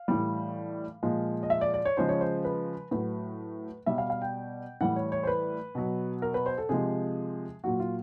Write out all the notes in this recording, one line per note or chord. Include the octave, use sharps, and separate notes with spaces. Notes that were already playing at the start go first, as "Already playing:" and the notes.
Already playing: F5
A2 E3 G3
A#2 F3 G#3
D#5
E5
D5
D5
C#5
C#3 F3 G#3 C5
C#5
C5
B4
A2 F#3 B4
B2 G3 E5
F5
F5
G5
A2 E3 G3 F#5
C#5
C#5
C5
B4
B2 F#3
A#4
B4
C5
A4
C3 F3 G#3 G#4
A#2 F#3 F#4
F4